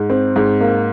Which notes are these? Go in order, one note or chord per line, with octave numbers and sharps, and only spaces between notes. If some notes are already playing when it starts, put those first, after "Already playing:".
Already playing: G#2
C4
G#2
A#3